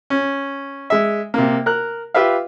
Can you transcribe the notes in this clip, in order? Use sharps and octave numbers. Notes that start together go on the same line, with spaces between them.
C#4
G#3 E5
C3 A#3
A#4 F#6
F4 G4 B4 E5 F5